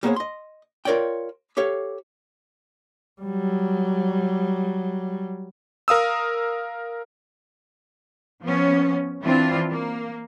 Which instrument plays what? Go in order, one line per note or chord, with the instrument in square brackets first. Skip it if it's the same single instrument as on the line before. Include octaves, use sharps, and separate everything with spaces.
[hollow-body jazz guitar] G3 A#3 B3 G#4 C5 C#5
D#5 C6
F4 A#4 C#5 D5 G5
G4 A4 C#5 F5
[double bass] F#3 G3
[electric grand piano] A#4 F5 D#6 E6
[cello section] F3 B3 C#4
E3 C4 D4 E4 F4
A#3